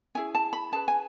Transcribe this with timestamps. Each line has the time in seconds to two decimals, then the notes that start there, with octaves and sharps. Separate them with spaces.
0.15 C#4 E4 G#4 G#5
0.35 A5
0.53 B5
0.72 C#4 G#4 B4 A5
0.88 G#5